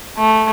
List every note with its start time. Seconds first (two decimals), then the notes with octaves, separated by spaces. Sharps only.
0.18 A3